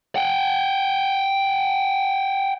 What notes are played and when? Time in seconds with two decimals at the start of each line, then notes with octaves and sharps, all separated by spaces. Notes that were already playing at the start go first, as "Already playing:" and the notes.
0.16 F#5 G5